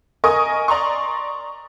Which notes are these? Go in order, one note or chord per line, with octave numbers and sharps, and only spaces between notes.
A#4 D#5 G#5 C#6 D#6
D5 A#5 C6 C#6